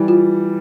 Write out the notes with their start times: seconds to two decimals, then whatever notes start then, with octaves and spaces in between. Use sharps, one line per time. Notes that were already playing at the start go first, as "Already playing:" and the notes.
Already playing: E3 G3
0.08 F4